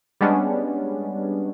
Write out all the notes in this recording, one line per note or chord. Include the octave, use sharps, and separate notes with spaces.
G3 G#3 B3 C#4 D4